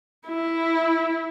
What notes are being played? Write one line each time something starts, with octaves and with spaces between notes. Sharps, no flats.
E4